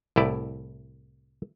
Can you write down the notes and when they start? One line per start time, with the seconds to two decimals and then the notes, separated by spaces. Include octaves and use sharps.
0.16 C2 A2 E4 D5